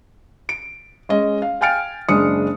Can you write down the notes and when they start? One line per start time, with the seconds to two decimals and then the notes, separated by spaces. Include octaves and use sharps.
0.49 D7
1.09 G#3 C#4 D#5
1.42 F5
1.61 F5 G5 G#5 F6 A6 D7
2.08 F#1 G#3 D4 D#6 C#7